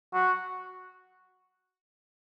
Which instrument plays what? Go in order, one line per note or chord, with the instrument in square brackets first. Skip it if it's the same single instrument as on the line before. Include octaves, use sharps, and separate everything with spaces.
[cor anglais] F#4